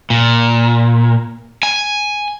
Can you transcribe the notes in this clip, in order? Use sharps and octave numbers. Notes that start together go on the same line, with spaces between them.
A#2
G#5